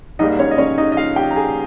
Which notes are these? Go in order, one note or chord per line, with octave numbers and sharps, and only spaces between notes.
G#2 G3 A#3 D#4 D#5
C#4 C#5
D#5
C#4 C#5
D#4 D#5
D#5
F4 F5
G4 G5
A#5
G#4 G#5